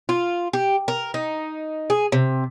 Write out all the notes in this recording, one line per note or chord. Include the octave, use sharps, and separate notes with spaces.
F4
G4
A#4
D#4
G#4
C3